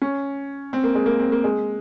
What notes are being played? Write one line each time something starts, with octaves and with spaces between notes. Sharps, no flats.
C#4
C4
A#3
G#3
A#3
C4
A#3
G#3